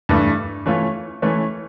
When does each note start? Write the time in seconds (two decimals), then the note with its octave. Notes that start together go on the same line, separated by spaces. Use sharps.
0.09 G2 E3 A3
0.66 E3 A3 C#4 F4
1.22 E3 A3 C#4